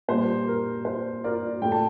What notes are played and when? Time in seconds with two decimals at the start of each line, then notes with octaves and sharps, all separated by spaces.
0.08 A#2 G3 A#3 C5
0.48 A#4
0.85 C5
1.24 A#4 D5
1.62 A2 A3 G5
1.72 A5